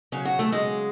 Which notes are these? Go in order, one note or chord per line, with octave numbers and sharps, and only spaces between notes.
C#3 F#3 C#4
F#4
A3
G#3